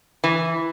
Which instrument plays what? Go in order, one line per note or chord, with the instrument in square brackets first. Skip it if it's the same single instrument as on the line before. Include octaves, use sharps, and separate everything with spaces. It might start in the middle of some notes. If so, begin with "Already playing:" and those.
[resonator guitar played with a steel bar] E3